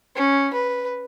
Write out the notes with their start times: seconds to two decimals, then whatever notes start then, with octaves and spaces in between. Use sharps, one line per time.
0.16 C#4
0.54 B4